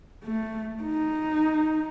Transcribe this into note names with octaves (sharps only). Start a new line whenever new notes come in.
A3
D#4